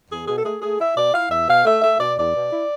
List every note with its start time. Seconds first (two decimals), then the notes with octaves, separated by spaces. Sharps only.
0.10 E2 G#4
0.27 B2 G#4
0.37 A4
0.44 A3 G#4
0.61 A3 G#4
0.79 E4 E5
0.95 B2 D5
1.13 E4 F5
1.30 E2 E5
1.48 B2 F5
1.65 A3 E5
1.81 A3 E5
1.99 B2 D5
2.17 E2 D5
2.33 B2
2.51 E4